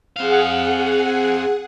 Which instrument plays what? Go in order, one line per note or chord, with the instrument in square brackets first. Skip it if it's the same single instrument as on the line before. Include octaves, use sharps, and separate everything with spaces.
[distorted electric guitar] C4 F5 [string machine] G#4 F#5